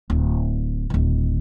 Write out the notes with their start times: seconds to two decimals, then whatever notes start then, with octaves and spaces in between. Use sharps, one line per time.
0.10 D1
0.90 D1 D#3